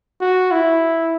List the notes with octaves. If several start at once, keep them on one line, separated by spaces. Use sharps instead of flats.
F#4
E4